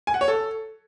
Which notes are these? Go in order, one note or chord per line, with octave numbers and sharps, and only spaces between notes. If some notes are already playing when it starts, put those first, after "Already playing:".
G#5
F#5
C#5
A4